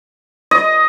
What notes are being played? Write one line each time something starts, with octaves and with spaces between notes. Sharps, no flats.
D#5